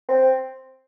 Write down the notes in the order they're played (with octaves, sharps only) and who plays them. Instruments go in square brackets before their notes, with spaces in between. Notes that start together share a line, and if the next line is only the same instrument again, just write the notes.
[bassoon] C4